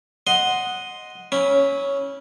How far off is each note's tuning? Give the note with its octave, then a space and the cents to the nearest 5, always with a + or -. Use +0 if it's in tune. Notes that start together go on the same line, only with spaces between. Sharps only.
D#5 +0 F#5 -10 C6 +0
C#4 +0 E4 -30 B5 +0